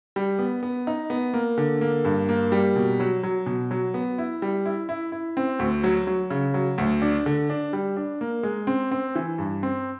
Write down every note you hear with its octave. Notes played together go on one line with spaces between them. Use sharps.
G3
B3
B3
D#4
B3
A#3
D3
A#3
G2
A#3
G3
B2
F#3
F#3
B2
F#3
B3
E4
G3
E4
E4
E4
C4
D2
F#3
F#3
C#3
F#3
D2
D4
D3
D4
G3
D4
A#3
G#3
C4
C4
E3
G2
C4